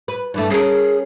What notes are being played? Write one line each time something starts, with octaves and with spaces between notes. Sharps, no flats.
B4
G2 E3 A3
C#4 G#4 A#4